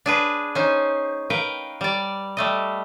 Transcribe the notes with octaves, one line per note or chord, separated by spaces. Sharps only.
D4 G#4 B4
C#4 D#4 C5
A#4 B4 F5 G5
G3 D5
G3 A3 D#5